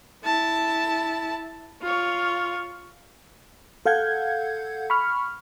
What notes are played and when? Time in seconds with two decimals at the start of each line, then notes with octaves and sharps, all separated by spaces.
0.24 E4 A5
1.82 F4 C#5
3.86 A4 F5 F#5 G6 G#6
4.90 B5 C#6 F6